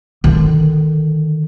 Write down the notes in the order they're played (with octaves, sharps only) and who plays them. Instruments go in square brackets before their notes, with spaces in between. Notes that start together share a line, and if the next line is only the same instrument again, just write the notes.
[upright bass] D3 D#3